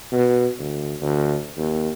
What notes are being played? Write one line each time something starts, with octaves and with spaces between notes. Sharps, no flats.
B2
D2
D2
D#2